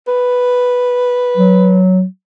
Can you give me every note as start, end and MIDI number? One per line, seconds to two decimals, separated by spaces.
0.08 1.80 71
1.37 2.04 54